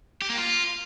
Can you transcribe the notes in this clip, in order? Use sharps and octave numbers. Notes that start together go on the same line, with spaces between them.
G4
A#3
F4